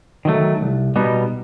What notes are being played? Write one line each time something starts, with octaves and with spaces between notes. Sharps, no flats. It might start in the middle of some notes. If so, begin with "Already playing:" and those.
D#3 F#3 A3
C2
B2 G3 B3 D#4